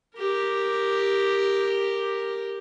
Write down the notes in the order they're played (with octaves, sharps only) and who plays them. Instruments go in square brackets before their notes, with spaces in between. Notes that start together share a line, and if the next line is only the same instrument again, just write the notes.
[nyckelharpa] G4 A#4